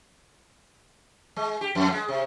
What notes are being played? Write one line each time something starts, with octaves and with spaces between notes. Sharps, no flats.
G#3
G4
F2
G#3
C3